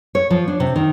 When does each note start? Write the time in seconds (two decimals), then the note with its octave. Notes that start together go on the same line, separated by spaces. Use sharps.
0.15 C#5
0.30 F3
0.48 D4
0.60 C3
0.76 D#3